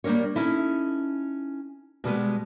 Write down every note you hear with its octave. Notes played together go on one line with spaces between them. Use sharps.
G3 A#3 D4 A#4 C#5
C#4 D#4 E4 A4
B2 G3 G#3 B3